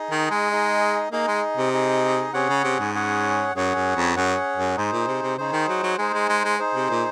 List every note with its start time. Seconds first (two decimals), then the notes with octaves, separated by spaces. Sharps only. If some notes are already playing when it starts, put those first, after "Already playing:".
Already playing: D#4 G#4 D#5
0.11 D#3
0.31 G#3
0.52 D#4 G#4 D#5
1.12 A#3 D#4 G#4 D#5
1.27 G#3
1.57 C3
1.73 D#4 G#4 D#5
2.33 C3 C#4 G#4 C#5 F#5
2.49 C#3
2.64 C3
2.79 G#2
2.95 C#4 G#4 C#5 F#5
3.55 F#2 C#4 G#4 C#5 F#5
3.75 F#2
3.96 F2
4.16 F#2 C#4 G#4 C#5 F#5
4.56 F#2
4.76 G#2 D#4 G#4 C5
4.92 A#2
5.07 C3
5.23 C3
5.38 C#3 D#4 G#4 C5
5.53 D#3
5.68 F#3
5.83 F#3
5.98 G#3 D#4 G#4 C5
6.14 G#3
6.29 G#3
6.45 G#3
6.59 D#4 G#4 C5
6.74 C3
6.90 A#2